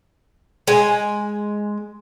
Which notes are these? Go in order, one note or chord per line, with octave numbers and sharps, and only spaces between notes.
G#3 G#5